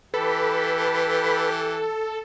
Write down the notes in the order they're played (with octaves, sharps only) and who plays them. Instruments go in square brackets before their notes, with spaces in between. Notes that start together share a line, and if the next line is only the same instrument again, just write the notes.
[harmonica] E3 G4 [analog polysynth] A4 [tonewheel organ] B4 B5